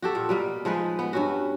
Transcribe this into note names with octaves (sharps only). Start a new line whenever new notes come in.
F#4 G4 A4
A#2
B2 G3 A#3
F3 G#3 D#4 B4
B3
G2 C#4 F#4